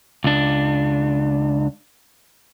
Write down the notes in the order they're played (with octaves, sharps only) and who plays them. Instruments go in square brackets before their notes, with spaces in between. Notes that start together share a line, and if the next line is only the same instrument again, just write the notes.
[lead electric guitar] C#2 D4